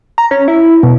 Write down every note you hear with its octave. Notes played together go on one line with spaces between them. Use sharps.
A#5
C#4
E4
B2